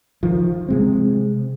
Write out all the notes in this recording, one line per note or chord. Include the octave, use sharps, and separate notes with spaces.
D#3 F3
C3 G#3 C4